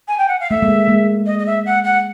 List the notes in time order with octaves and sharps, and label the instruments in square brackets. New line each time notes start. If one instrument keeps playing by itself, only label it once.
[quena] G#5
G5
F#5
F5
[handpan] A3 [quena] E5
[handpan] G#3 A#3
G#3 A#3
[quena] D#5
D#5
E5
F#5
F#5